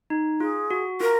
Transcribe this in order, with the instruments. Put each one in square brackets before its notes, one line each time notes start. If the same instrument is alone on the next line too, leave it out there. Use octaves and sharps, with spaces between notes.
[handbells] D#4
[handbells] F4 [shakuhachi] G#4
[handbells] F#4
[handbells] F4 [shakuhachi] A#4